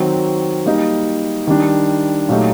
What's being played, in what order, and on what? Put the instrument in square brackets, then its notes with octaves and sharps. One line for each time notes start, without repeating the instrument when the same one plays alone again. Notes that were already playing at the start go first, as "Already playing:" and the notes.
Already playing: [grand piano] D#3 F#3 C4 F#4
G3 A#3 D#4
D#3 G3 D4
A#2 F#3 A3 D#4 G4